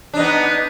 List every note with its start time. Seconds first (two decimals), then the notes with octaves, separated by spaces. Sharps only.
0.14 D4
0.17 D#4
0.20 B3